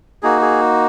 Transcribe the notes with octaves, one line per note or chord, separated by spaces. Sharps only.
A#3 D#4 F#4 G#4
G#4